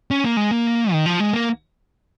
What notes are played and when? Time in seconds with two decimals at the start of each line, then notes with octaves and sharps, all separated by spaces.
0.11 C#4
0.24 A#3
0.37 G#3
0.51 A#3
0.92 D#3
1.06 F3
1.20 G#3
1.33 A#3